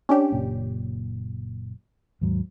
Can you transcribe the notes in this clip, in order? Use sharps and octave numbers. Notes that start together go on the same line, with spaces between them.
C#4 D4 G4
F#1 A#2
D#2 G#2 F#3